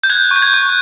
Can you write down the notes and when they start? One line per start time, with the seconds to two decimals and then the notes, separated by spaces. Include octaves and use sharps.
0.03 G6
0.10 F#6 G#6
0.31 C#6 G6
0.42 G#6
0.54 C#6